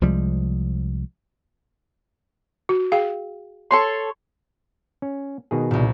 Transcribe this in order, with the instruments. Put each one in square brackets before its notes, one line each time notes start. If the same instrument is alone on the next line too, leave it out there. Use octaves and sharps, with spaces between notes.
[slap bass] C2 F3 G3 G#3
[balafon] F#4
G#4 F5 G5
[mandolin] A4 C#5 C6
[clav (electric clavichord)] C#4
B2 D#3 G#4
[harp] C2 A#2